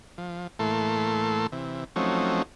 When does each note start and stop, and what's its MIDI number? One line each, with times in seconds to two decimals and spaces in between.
0.18 0.47 53
0.59 1.47 45
0.59 1.47 52
0.59 1.47 57
0.59 1.47 58
0.59 1.47 69
0.59 1.47 84
1.52 1.84 48
1.52 1.84 52
1.96 2.42 53
1.96 2.42 54
1.96 2.42 57
1.96 2.42 60
1.96 2.42 61
1.96 2.42 63